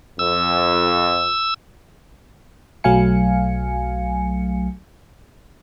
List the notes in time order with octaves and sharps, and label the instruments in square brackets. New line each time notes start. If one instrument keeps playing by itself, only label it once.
[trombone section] F2 [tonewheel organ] E6
[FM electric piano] B1 F#3 A3 F5 G#5 C#7